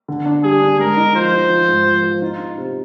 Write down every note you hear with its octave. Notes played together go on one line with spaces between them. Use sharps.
D3
D4
G3 G#4
D4
G#3 A#4
D#4
F3 C5
D#4
F3
G#2
F3
F3
D#4 F4
D#4
C3